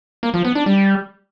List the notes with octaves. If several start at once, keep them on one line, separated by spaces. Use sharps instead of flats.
A#3
F3
B3
D4
G3